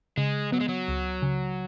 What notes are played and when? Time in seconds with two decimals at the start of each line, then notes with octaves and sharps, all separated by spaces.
0.17 C#3 G#3
0.52 F#3 B3
0.60 G#3
0.68 F#3
0.88 C#2
1.22 C#3